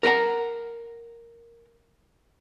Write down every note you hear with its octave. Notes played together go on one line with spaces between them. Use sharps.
A#4 F#5 G5 A#5